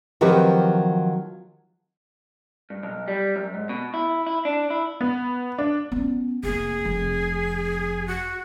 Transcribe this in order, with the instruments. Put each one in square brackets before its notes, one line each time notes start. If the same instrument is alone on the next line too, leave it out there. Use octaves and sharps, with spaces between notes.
[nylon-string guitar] D#3 F3 F#3 C4 G4 B4
[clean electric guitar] G2
B1
G3
F#2
G#2
B2
E4
E4
D4
E4
[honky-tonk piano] B3
D4
[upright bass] B3 C#4
[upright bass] F1 A#3 [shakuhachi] G#4
[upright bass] F1 F2
[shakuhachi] F#4